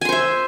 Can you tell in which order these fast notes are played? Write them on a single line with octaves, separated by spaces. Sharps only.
G#5 C6 C5 E5